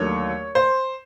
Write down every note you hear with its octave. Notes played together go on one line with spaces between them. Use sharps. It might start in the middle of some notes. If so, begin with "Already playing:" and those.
Already playing: D#2 D3 F#3 A3 C#5
C5